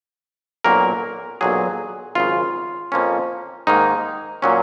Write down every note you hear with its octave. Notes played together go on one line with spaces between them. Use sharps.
B1 A#2 F#3 A#3 C#4 A#4
B1 A#2 F#3 G#4
G#1 F#2 C#3 F4
F2 F3 A#3 C#4
G#2 D#3 A#3 D#4
A#2 F#3 C#4